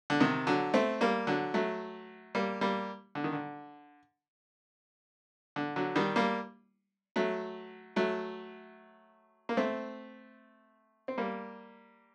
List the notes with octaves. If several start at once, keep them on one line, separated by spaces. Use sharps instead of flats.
D3
C3 D#3
D3 F#3
A3 C4
G3 A#3
D3 F#3
F#3 A3
G3 A#3
G3 A#3
D3
D#3
D3
D3
D3 F#3
D#3 G3
G3 A#3
F#3 A3
F#3 A3
A#3
A3 C4
C4
G3 A#3